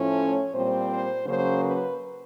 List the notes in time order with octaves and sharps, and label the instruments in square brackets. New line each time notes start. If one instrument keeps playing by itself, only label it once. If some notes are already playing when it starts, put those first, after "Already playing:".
Already playing: [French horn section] A2 F3 A3 C#4
C#5
A#2 G3 C4 C5
C5
C#3 F#3 A#3 C#4 C5
B4